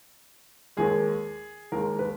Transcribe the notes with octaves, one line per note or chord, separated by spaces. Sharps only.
D#2 D#3 G#3 G#4
D#2 D#3 G#3 A#4
B4